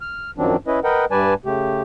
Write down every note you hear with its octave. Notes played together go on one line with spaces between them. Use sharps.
F6
F#2 D#3 F3 F#3 C4 D4
C#4 E4 B4 D#5
A#4 B4 D#5 F#5 G5
G2 G3 B4 D5 G#5 A5
C#3 A3 G4